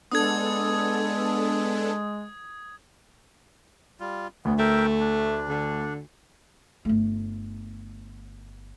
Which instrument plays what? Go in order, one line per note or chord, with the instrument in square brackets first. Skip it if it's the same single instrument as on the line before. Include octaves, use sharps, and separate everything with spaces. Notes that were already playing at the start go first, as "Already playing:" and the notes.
[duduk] G#3 [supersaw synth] B3 D4 A4 [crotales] D#6 G#6
[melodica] G3 F4
[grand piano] D2 [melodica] B3
[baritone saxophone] A3 [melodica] A#4 E5 G5
[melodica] D4
[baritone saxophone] D3
[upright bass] G1 A3